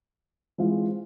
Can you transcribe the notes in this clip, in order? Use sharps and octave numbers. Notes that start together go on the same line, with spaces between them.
E3 G#3 C4 F4